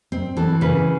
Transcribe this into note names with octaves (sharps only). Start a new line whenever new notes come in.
C4
E3 A4
C#3 B4